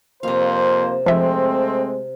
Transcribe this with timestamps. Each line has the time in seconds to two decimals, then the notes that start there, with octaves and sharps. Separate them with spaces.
0.23 F2 C3 A#3 C5 F5
1.06 F3 G#3 A3 C4 E5